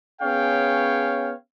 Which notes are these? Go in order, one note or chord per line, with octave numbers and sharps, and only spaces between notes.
B3 C#4 G#4 C#5 F5 G5